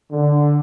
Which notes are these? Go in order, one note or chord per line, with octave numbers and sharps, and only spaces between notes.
D3